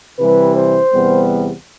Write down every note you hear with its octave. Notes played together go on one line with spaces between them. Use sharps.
C3 E3 G3 B4
C5
E2 C3 G3 B3